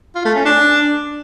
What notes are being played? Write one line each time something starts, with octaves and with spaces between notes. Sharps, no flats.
F4
A3
C#4
D4